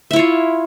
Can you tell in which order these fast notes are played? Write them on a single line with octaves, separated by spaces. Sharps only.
E5 E4 C#5 F4